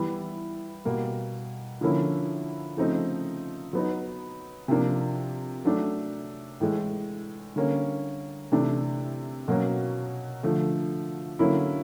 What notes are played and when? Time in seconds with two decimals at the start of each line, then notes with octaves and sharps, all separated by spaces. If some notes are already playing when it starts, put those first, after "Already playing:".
Already playing: E3 G3 B3 E4
0.85 B2 G3 A#3
1.81 D3 F3 A#3 C#4 E4
2.77 C#3 F3 A3 C4 D#4
3.73 F#3 B3 D#4
4.68 C3 F3 A#3 D4
5.65 F#3 A3 D4
6.60 A2 E3 G#3
7.56 D3 G3 A#3 C#4
8.52 C3 E3 A3 D4
9.48 B2 F#3 A#3 C#4
10.43 D3 F3 A3
11.39 D3 F#3 A#3 C#4 E4